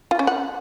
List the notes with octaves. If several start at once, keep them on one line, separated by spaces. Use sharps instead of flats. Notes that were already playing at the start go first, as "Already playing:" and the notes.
F4
C#4
F#5